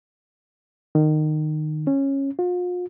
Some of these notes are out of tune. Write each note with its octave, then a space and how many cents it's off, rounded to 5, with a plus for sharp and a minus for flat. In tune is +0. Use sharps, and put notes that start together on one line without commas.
D#3 -20
C#4 -15
F4 +40